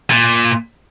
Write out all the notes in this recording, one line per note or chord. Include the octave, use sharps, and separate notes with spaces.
A#2